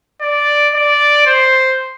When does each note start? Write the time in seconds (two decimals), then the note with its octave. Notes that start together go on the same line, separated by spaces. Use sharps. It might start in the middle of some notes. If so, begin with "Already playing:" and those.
0.21 D5
0.75 D5
1.26 C5